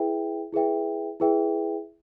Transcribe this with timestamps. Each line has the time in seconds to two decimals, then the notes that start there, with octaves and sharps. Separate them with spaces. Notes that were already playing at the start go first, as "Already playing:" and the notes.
Already playing: E4 G#4 B4 E5 G5
0.53 E4 G#4 B4 E5 G5
1.20 E4 G#4 B4 E5 G5